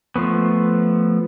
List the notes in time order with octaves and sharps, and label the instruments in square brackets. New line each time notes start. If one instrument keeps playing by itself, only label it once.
[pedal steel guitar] F3 A3 B3